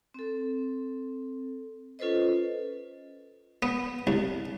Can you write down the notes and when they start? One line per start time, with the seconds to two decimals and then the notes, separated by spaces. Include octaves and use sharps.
0.14 C4 A4
1.99 C#4 F4 A4 B4 C5 D#5
3.63 B3
4.07 C2